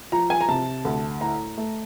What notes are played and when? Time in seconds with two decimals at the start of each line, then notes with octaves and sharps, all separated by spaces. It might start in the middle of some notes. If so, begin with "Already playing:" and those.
0.12 F3 A#5
0.30 G#5
0.41 A#5
0.48 C3 A5
0.85 D2
1.21 A2 A#5
1.58 A3